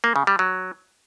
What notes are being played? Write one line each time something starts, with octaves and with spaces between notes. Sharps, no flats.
A#3
C#3
G3
F#3